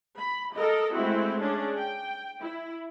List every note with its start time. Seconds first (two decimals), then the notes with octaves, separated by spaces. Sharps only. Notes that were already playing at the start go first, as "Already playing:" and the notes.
0.18 B5
0.55 A4 A#4 D#5
0.93 G#3 A3 C4 E4 F#4
1.40 C#4 D4 G#4
1.77 G5
2.41 E4